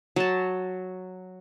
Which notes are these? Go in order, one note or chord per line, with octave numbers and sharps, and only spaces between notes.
F#3 A5